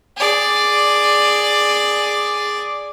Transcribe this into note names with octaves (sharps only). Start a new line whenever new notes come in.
G#4 D5